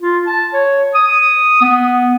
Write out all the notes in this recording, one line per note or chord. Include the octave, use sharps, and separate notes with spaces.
F4
A5
C#5
D#6
B3